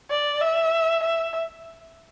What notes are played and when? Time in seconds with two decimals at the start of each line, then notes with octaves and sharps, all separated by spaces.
0.10 D5
0.41 E5
1.03 E5